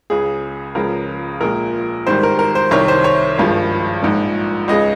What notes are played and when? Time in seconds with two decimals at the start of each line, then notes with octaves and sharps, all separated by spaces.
0.10 C#2 C#3 G#3 G#4
0.75 C#2 C#3 F3 G#3 A#4
1.41 A#1 A#2 G#3 A#4
2.07 G#1 G#2 D#3 G3 C5
2.23 A#4
2.39 A#4
2.55 C5
2.71 C2 C3 D#3 G3 C#5
2.88 C5
3.04 C#5
3.38 G#1 G2 F3 G#3
4.03 A#1 G#2 F3
4.68 C#2 C#3 G#3 D#5